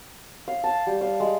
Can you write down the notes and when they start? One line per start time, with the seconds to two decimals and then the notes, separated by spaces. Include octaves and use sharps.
0.48 F5
0.64 A5
0.87 G3
1.01 F5
1.20 G#3